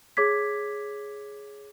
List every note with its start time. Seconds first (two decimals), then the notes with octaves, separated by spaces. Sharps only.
0.17 G#4 C#5 D6 G#6 B6